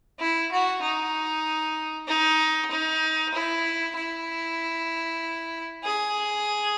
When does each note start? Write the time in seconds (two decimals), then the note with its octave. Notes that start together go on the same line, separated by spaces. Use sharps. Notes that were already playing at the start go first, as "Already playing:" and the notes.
0.20 E4
0.51 F#4
0.82 D#4
2.08 D#4
2.71 D#4
3.34 E4
3.96 E4
5.84 G#4